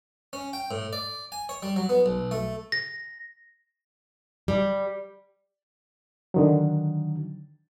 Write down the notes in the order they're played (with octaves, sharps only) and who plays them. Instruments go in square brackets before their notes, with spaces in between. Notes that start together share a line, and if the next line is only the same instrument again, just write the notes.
[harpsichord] C#4
G5
A2
D5
G#5
C#5
G3
F#3
B3
B1
A3
[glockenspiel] A#6
[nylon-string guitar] G3
[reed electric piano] D3 D#3 F#3